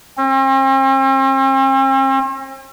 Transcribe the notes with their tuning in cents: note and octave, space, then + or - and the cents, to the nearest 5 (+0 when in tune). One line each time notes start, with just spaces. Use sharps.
C4 +45